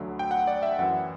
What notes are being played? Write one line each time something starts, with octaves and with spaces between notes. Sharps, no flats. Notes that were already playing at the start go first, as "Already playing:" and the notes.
Already playing: D2 D3 F#3
G5
F#5
D5
E5
F#2 E3 F#5